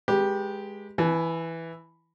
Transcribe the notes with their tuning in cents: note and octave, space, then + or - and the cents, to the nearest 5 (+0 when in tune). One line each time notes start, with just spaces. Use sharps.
G#3 +0 G4 +5 B4 -30
E3 +0 B4 +0 G#5 +45